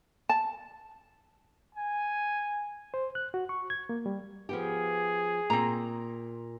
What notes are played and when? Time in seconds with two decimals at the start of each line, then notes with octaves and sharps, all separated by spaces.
0.29 A5
1.75 G#5
2.94 C5
3.15 F#6
3.34 F#4
3.49 C#6
3.70 G#6
3.89 A#3
4.06 G3
4.49 F3 B3 G4 G#4
5.50 A#2 C4 A#5